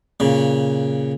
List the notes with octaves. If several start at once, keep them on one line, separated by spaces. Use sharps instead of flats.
A#2 C#3